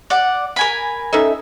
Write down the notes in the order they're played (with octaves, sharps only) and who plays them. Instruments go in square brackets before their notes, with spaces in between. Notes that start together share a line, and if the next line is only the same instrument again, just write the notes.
[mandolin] D5 F#5
A#4 G#5 B5
[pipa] C#4 D#4 E5 [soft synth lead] A4